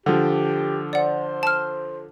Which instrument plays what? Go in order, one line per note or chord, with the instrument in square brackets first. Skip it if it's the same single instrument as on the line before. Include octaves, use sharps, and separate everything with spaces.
[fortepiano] D3 F3 [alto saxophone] G4
[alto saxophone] C5 [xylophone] D5 F#5
[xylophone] A5 F6